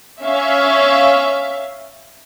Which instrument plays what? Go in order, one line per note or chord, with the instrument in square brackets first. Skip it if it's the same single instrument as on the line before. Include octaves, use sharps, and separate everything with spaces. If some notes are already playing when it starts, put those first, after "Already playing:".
[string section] C#4 E5 F5